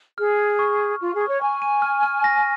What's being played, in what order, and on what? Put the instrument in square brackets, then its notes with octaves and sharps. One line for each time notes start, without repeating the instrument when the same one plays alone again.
[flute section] G#4 [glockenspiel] F6
[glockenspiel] F6
C#6
C#6
[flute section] F4 [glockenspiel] C#6
[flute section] G#4
[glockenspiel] C#6
[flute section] C#5
[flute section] G#5 [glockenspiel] C#6
[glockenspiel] D#7
F6
F6
A#6